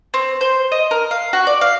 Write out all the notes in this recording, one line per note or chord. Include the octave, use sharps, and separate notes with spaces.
C4
C5
D#5
A#4
F5
F#4
D5
F5